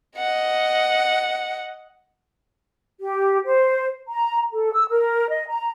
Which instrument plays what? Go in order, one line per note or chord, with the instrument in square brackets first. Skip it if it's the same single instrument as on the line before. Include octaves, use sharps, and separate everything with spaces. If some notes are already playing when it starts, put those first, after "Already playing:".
[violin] D#5 F#5
[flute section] G4
C5
A#5
A4
E6
A#4
D#5
A#5